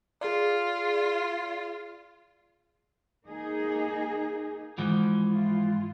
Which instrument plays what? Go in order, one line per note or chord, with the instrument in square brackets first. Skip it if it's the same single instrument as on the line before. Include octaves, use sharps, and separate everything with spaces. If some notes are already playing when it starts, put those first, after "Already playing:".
[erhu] F4 [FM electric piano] G#4 D5
[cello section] A#3 D#4 G#4
[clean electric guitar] G#2 E3 F3
[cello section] E4 F4